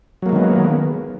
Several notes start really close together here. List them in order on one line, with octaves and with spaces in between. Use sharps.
F#3 A#3 G#3 D#3 B3